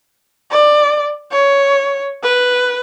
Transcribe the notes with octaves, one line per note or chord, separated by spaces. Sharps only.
D5
C#5
B4